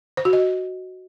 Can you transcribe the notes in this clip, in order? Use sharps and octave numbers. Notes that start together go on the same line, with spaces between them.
C5
F#4
D#5